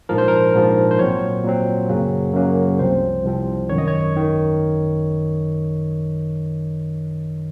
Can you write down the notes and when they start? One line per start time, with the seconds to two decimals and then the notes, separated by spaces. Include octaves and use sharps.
0.09 A#1 G#2 F3 A#4
0.18 C5
0.28 A#4
0.54 A#1 G#2 F3
0.91 C5
0.99 A#2 F#3 C4 C#5
1.44 A#2 F#3 C4
1.89 F#2 C#3 F#3 A#3 C#4
2.34 F#2 C#3 F#3 A#3 C#4
2.79 C2 C3 F3 C4 C5
3.24 C2 C3 F3 C4
3.69 G#1 F#2 D#3 C#5
3.78 D#5
3.88 C#5
4.17 D#3